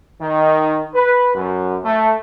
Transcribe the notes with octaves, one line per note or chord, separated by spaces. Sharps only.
D#3
B4
F#2
A3